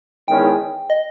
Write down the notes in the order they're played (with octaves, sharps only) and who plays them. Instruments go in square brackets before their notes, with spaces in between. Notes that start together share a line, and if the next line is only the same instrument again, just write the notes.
[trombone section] E2 D#3 G#3 C#4 [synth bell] G5
[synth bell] D#5